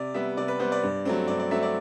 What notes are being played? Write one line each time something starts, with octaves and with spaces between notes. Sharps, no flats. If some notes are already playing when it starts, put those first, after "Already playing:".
Already playing: C3 D5
G3 B3 E5
C3 D5
B4
G3 B3 C5
D5
G2
F#3 A3 C4
G2 D5
D5
F#3 A3 C4 E5
D5